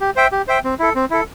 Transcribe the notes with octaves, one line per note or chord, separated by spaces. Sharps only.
G4
C5 E5 G5
G4
C5 E5 G5
C4
E4 A4
C4
E4 A4